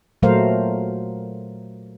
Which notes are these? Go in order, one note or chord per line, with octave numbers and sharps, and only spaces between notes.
A#2 F#3 A3 A#4 C5 F5